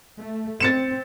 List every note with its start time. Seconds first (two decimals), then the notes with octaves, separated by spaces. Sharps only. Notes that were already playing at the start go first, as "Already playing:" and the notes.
0.19 A3
0.60 C4 A6 C#7 E7